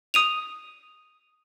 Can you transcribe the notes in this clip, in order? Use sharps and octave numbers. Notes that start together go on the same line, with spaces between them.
D#6 D#7 F7